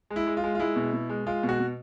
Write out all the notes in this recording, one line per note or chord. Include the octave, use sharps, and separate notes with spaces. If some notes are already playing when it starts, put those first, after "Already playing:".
G#3
E4
G#3
F4
G#3
F4
G#3 E4
B2
B2
G#3
G#3 F4
B2
F#4
B2